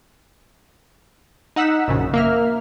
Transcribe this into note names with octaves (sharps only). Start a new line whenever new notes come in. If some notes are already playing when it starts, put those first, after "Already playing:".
D#4 F#5 E6 B6 E7
A#1 F#2 C#3
A#3 E5 F6